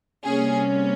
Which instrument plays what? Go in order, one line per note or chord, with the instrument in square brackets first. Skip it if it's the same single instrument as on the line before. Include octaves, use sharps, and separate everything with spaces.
[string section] C3 G3 A#3 C#4 G#4